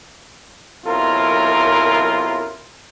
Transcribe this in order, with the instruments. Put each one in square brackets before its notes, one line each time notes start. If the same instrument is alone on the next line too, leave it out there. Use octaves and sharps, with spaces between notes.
[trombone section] B1 F#2 C3 E4 F4 A#4